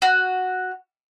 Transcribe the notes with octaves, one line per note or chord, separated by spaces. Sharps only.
F#4